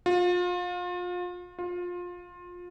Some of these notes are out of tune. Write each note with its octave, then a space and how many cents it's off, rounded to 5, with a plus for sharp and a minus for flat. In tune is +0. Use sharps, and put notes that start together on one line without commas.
F4 +30
F4 +20